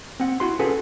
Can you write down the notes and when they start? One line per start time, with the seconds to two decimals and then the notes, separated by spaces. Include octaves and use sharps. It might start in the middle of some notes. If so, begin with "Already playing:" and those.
0.20 C4 F#5
0.40 E4 F#4 C6
0.59 C#4 F4 F#4 G#4 A4 B4